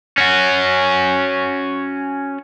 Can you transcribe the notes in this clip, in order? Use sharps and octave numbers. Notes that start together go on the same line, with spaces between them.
C#4 F#4